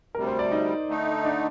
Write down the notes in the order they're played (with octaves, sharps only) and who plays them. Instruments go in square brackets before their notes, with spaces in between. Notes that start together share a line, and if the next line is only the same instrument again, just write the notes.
[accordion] D2 C3 G3 [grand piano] A#4
[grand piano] C5
D5
D#4
[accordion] D3 A3 D#4
[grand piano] D4